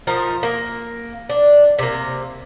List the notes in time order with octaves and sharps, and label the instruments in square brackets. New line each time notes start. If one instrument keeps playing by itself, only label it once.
[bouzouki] F3 D#4 A#4
A#3
D4
C3 A#3